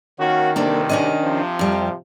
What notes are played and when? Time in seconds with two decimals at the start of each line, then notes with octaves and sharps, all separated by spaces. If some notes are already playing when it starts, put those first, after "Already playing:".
0.19 D#3 A#3 C#4 F#4
0.56 D2 G2 C3 A#3 D4 A4
0.89 C#4 D4 D#5
1.22 C3 F3
1.59 F2 G3